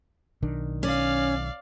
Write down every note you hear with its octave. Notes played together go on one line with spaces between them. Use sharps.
B1 D#3 D4
C#4 D5 F5